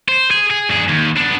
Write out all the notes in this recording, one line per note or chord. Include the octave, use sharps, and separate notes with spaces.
C5
G#4
G#4
G2 G#4
D#2
B3 D4